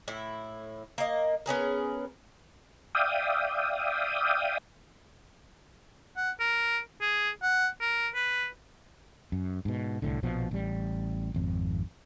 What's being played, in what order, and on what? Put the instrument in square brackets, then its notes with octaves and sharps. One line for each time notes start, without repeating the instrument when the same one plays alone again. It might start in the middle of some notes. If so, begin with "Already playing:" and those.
[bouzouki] A2 E4
A#3 D#5
B3 C#4 G#4 A#4
[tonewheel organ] D5 E5 F5 G5 D#6
[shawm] F#5
A#4
G#4
F#5
A#4
B4
[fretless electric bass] F#2
G#2 B2
C2 A2 D3
A#1 B2 F3
A1 G3
G#1 F2